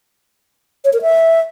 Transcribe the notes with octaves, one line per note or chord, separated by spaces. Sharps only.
C#5
A#4
E5